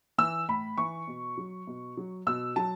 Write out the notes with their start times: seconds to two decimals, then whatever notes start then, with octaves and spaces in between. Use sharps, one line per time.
0.18 E3 E6
0.48 A2 B5
0.78 E3 C#6
1.07 B2
1.37 F#3
1.67 B2
1.97 F#3
2.27 B2 E6
2.56 F#3 A5